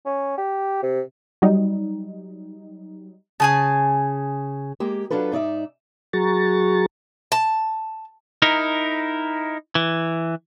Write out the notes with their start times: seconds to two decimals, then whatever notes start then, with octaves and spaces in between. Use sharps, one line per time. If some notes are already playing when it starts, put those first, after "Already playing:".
0.05 C#4
0.37 G4
0.83 C3
1.42 F#3 G3 D#4
3.40 C#3 G#4 G#5 A5
4.80 G#3 A#3 G4
5.10 F#3 D4 F4 A4 B4
5.32 G#2 D#4 D5 E5
6.13 F#3 F#4 G#4 A#5 C#6 A6
7.32 A5
8.42 D#4 E4 A#4
9.75 E3